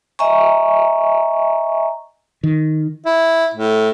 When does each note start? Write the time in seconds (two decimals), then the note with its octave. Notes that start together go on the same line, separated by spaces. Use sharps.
0.19 D#5 E5 G#5 A#5 C#6
2.43 D#3
3.06 E4
3.54 A2